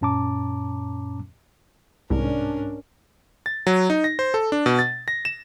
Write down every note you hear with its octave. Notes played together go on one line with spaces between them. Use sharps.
F#2 A#2 C#4 A5 A#5 D6
C2 G#2 C#4 D4 A#4
A6
F#3
D#4
A#6
C5
A4
D4
B2
A6
A#6
E7